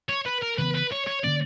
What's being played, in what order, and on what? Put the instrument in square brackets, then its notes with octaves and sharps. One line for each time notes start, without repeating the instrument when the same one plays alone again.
[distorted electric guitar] C#5
B4
A#4
[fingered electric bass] C#3 E3 B3 [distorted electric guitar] B4
[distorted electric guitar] B4
C#5
C#5
[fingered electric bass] D3 F#3 A#3 C#4 [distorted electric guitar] D5